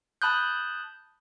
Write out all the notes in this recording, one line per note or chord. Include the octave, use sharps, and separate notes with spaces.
A5 B5 D#6 F#6 G6